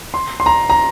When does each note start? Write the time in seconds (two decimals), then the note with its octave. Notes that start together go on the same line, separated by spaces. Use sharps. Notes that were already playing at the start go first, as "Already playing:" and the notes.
0.14 C6
0.40 C6
0.46 A#5
0.70 A#5